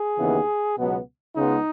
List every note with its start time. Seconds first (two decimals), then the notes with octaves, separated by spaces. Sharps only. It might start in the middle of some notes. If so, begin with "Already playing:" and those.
Already playing: G#4
0.17 D#2 C#3 E3 B3
0.77 C#2 B2 F#3 B3
1.36 C#2 C#3 G#3 B3 D#4